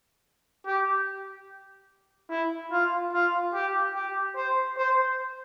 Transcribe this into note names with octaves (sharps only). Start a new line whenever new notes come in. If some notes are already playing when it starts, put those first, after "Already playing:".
G4
E4
F4
F4
G4
G4
C5
C5